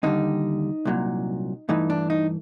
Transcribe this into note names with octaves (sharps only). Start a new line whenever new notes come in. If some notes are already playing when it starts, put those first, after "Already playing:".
D#2 D3 G3 D#4
C2 A#2 F#3
G2 E3 A3 D#4
D4
D#4